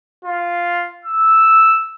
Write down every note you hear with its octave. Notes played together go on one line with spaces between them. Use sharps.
F4
E6